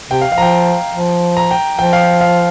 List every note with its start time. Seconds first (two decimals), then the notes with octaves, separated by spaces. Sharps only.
0.10 C3 G5
0.21 F5
0.32 F3 F5
0.38 A#5
0.42 G5
0.94 F3
1.37 A#5
1.51 G5
1.79 F3 G5
1.93 F5
2.21 F5